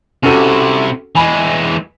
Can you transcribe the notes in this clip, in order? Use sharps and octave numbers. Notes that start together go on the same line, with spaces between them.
C3 C#4 E4 F#4 A4
E3 G#3 G#5 B5